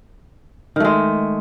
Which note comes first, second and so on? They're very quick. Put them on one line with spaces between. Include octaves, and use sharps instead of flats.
D#3 A3 G#3